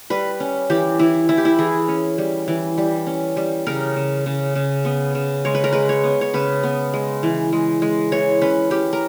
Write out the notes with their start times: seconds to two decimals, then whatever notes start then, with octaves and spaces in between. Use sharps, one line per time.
0.10 G3 B4
0.40 C#4
0.70 E3 G4
0.99 E3 E4
1.29 E3 E4
1.37 G4
1.45 E4
1.58 E3 G#4
1.88 C#4
2.18 G3
2.48 E3
2.78 G3
3.07 C#4
3.37 G3
3.67 C#3 A#4
3.96 C#3
4.26 C#3
4.55 C#3
4.85 B3
5.15 C#3
5.45 G#3 C#5
5.55 B4
5.64 A#4
5.72 G#3 B4
5.89 C#5
6.04 B3
6.21 C#5
6.34 C#3 B4
6.64 B3
6.94 G#3
7.23 E3
7.53 G#3
7.82 G#3
8.12 E3 C#5
8.42 C#4 B4
8.71 C#4 G4
8.93 A#4